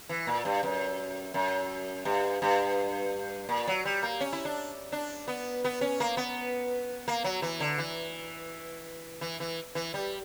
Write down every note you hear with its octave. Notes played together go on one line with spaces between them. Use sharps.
E3
A#2
G2
F#2
F#2
G2
G2
A#2
F#3
G3
A#3
C#4
E4
D4
D4
B3
B3
C#4
A#3
B3
A#3
F#3
E3
D3
E3
E3
E3
E3
G3